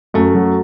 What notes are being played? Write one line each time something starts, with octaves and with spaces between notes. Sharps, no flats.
F#2 A3
F#3